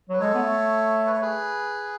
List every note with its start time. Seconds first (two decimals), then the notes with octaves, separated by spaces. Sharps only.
0.10 F#3 B4
0.20 G#3 A4 C#5
0.35 B3
0.42 A3
1.06 B4
1.13 C#5
1.21 G#4 B4